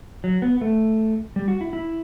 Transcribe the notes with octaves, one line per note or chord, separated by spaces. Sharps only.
F#3
B3
A3
G3
F#4
E4
E4